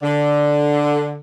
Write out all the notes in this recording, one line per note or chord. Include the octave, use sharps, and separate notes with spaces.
D3